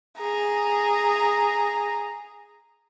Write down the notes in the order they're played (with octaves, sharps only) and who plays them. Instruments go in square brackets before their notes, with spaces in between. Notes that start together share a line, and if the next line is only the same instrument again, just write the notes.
[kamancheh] G#4 A#5